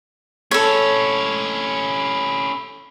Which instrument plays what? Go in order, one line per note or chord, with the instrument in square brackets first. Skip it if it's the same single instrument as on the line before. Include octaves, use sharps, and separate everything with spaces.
[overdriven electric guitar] C#4 E4 [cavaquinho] A4 C#5